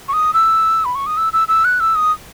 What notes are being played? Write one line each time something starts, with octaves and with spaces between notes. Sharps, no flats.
C#6
D#6
E6
B5
C#6
D#6
E6
E6
E6
F#6
E6
D#6